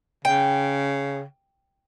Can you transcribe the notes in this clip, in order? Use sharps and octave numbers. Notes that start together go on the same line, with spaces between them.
C#3 G5